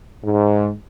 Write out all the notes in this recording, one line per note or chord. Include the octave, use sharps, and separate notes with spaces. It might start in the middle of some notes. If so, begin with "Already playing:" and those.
G#2